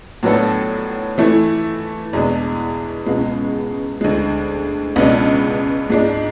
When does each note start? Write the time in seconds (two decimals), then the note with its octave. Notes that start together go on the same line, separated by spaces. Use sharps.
0.23 A2 F#3 B3 D4 A4
1.18 E3 A3 E4
2.13 E2 B2 G#3 D4
3.06 C#2 B2 G#3
4.01 D2 D3 G#3
4.96 C#2 B2 G#3 D4
5.90 G#2 G#3 D4